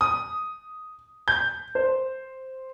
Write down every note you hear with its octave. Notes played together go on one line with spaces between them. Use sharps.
D#6
G6
C5